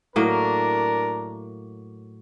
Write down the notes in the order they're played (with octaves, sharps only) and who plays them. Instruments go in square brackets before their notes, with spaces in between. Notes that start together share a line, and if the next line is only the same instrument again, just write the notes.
[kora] A2 F#3 A#3 [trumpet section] D4 A#4